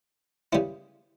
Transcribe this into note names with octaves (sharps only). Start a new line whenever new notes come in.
C#3 G3 B3 E4